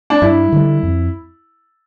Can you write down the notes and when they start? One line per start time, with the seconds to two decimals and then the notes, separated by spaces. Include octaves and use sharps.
0.10 D4
0.22 G2 E4
0.52 D3 G3
0.83 F2